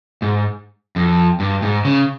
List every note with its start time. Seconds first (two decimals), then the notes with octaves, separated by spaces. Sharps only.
0.22 G#2
0.96 F2
1.40 G2
1.62 G#2
1.85 C#3